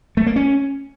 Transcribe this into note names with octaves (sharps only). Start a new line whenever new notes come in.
A3
A#3
C#4